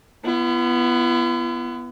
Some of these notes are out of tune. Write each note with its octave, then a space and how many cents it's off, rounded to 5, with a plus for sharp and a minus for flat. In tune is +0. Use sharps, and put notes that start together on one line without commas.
B3 +0 E4 +45